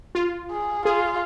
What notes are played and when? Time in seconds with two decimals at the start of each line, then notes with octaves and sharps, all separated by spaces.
0.15 F4
0.51 G#4
0.85 F4 G#4